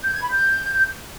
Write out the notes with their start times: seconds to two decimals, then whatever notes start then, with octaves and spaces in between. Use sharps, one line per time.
0.03 G6
0.13 G#6
0.22 B5
0.31 G6